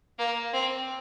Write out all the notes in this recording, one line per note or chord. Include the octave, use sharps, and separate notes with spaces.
A#3
C4